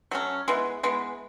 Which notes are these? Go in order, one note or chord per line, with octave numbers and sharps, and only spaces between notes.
F#3 A3 C#4
E3 G#3 B3
E3 G#3 B3